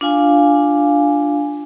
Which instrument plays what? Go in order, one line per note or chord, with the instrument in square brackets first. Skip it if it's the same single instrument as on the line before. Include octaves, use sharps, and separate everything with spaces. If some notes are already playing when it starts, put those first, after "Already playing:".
[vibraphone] D4 F4 F5 G#5